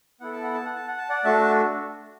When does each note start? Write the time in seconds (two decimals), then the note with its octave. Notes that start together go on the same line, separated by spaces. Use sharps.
0.20 B3 E4 A4 F#5
0.32 A5
0.43 F#5
0.54 A5
0.65 F#5
0.76 A5
0.87 F#5
0.98 A5
1.09 D5 F#5
1.24 A3 D4 F#4 E5 A5